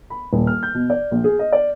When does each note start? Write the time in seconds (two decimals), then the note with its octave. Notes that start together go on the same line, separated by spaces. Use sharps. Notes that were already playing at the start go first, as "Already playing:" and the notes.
0.10 B5
0.33 D#1
0.47 F6
0.63 G6
0.74 B2
0.90 D5
1.11 A#1
1.24 G#4
1.39 D#5
1.52 D5